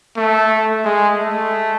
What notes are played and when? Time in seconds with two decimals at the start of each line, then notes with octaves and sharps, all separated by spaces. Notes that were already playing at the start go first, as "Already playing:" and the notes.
0.17 A3
0.85 G#3
1.19 A3